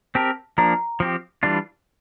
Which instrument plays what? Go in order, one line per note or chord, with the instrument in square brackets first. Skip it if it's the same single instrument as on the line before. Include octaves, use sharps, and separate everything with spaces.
[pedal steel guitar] C4 G4 A#4 [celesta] A5
[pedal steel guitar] F3 A#3 D4 [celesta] A#5
[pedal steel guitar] F3 C4 G4
E3 G3 D4 F4